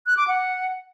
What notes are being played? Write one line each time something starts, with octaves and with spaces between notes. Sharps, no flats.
F#6
D6
F#5